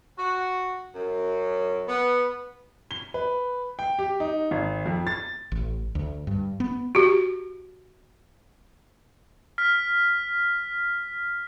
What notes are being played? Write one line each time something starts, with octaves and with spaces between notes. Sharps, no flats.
F#4
F#2
B3
G7
B4
G5
G4
D#4
G#1
F2
A6
A1
D2
G2
B3
F#4 G4
F6 B6